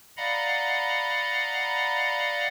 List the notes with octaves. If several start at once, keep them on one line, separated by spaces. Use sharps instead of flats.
D5 D#5 F5 F#5 A#5 B5